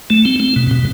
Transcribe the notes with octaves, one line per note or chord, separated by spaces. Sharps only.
A3
C4
C4
B2
B2